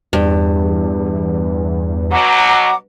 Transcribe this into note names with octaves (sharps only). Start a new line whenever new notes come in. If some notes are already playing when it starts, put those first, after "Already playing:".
E2 G2
B2 F#3 F#5 A#5 D6